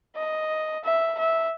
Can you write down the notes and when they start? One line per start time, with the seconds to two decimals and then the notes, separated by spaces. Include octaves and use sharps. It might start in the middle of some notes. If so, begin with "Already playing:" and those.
0.16 D#5
0.84 E5
1.19 E5